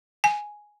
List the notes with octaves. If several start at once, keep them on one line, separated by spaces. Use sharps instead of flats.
G#5